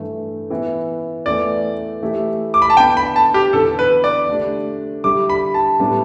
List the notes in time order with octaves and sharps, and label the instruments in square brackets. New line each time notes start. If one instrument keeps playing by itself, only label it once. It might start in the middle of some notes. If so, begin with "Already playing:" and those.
Already playing: [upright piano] G2 E3 A3
E3 B3 E4
[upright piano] E2 E3 A3 [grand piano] D5
[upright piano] E3 A3 E4 G4
[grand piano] D6
B5
A5
[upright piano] D3 B3 E4 [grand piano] G5
[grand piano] B5
A5
G4
[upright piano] E2 D3 B3 [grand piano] A4
[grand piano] B4
D5
[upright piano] D3 A3 D4 G4
[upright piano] D3 G3 E4 G4 [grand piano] D6
[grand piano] B5
A5
[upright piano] A2 G3 B3 D4 G4